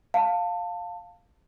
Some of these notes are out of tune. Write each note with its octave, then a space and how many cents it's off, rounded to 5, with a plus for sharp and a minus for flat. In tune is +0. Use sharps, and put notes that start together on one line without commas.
F5 +10 A5 +20